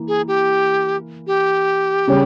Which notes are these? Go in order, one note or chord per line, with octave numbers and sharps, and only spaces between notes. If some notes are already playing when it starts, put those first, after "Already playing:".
Already playing: E3 A#3
G#4
G4
G4
C#3 G3 C#4